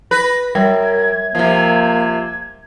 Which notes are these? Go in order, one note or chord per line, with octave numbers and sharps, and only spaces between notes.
B4 A#6
F#2 G3 A#4 G#6
C3 F3 A#3